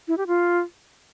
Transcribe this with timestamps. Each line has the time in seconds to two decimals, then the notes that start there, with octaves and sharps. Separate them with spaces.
0.08 E4
0.18 G4
0.27 F4